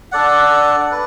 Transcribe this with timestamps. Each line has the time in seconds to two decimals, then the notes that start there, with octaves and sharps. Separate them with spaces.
0.12 D4 A4 D5 F#5
0.91 B4